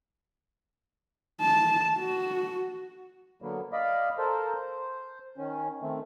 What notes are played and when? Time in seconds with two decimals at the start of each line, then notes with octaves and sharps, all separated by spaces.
1.41 A5
1.99 F#4
3.42 D3 F#3 A#3 B3
3.73 D5 D#5 F5 B5
4.18 A4 A#4 C5
4.55 C5
5.38 D#3 C#4
5.82 D#3 A3 C4